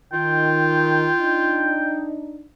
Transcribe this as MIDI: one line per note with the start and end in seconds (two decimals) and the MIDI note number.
0.13 1.10 51
0.13 1.90 65
0.13 2.05 79
1.18 2.45 62
1.18 2.45 63